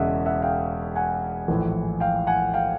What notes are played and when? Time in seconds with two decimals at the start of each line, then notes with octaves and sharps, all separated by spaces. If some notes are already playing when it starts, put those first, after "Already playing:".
Already playing: E1 E2 C#3 D#5 E5 F#5
0.26 E5 F#5
0.42 F5 G5
0.95 F#5 G#5
1.48 A#1 A2 E3
2.00 F5 G5
2.27 F#5 G#5
2.54 F5 G5